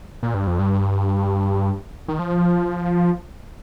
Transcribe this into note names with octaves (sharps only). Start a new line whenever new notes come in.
A#2
G2
F2
G2
D#3
F3